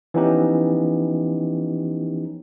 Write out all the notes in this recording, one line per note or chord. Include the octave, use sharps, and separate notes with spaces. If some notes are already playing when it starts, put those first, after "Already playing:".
E3 F3 B3 C#4 D#4 G4